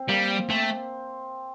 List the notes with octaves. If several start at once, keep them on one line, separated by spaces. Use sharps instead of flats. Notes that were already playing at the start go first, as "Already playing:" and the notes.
Already playing: C4
G3 A#3
A3 C4